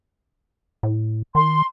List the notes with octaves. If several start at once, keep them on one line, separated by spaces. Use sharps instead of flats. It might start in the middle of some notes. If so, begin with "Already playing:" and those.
A2
D#3 C6